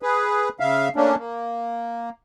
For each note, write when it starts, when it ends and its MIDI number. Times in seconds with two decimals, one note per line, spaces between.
0.02 0.49 68
0.02 0.49 71
0.60 0.89 49
0.60 0.89 76
0.60 0.89 77
0.96 1.15 57
0.96 1.15 58
0.96 1.15 61
0.96 1.15 62
1.18 2.09 58